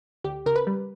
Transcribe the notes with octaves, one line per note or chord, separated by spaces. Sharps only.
D2 G4
C#3 A#4
B4
G3